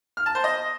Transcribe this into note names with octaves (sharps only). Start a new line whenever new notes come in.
F6
A5
C5
D#5